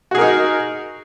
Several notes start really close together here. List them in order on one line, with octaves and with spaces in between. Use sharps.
F#4 G#4 A#4 D#4